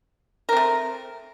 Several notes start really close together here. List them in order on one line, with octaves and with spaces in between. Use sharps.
A#4 C4 A3